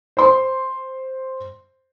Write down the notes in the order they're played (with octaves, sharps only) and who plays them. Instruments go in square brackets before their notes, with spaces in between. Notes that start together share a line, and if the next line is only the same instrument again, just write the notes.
[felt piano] C5 C6